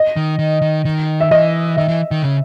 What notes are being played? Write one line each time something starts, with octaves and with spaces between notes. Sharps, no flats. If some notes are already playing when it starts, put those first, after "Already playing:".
Already playing: D#5
D#3
D#3
D#3
D#3
E5
E3 D#5
D#3 E5
E3
D#3
C#3